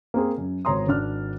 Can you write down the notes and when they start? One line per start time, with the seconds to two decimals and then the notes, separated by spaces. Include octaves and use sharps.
0.14 A#3 C4 G#4
0.38 F#2
0.65 G#1 C#5 A#5 C6 D#6
0.87 G#1 D4 F6